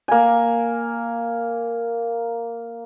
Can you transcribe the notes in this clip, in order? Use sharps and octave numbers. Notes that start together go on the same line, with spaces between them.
A#3 G#5